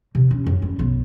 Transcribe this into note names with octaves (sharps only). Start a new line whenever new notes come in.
C3
C#4
F#2
G3
B1